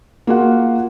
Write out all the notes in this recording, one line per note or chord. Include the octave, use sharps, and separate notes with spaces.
A#3 F4 F#4 G#4 F#5